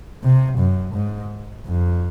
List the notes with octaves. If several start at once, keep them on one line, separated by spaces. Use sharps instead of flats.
C3
F#2
G#2
F2